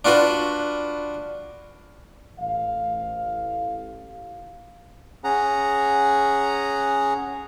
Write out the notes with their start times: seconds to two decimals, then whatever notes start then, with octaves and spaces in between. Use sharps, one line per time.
0.05 D4 F4 F#4 B4
2.40 A1 F5
5.24 C#4 G#4 F#5 A#5